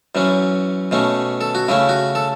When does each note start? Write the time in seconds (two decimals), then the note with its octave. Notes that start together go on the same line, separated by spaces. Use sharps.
0.15 F#2 E3 C#4
0.91 B2 A3 C#4
1.41 A4
1.55 F#4
1.68 C#3 A3 C#4 E4
1.89 F#4
2.15 A4